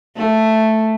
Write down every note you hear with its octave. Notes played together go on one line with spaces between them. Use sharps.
A3